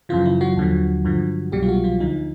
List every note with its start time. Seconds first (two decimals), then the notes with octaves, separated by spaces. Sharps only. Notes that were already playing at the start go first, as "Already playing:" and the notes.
0.09 F#2 C#3 E3 F3 F4
0.26 E4
0.41 F#3 F#4
0.57 D#2 D3 F3
1.05 G2 D3 F3
1.52 C2 B2 F#3 G3 G4
1.63 F4
1.68 F#3 F#4
1.84 F3 F4
2.00 D2 D3 F3 D#4